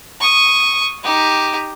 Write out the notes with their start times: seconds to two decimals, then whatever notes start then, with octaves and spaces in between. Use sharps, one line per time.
0.21 C#6 D#6
1.04 D#4 G4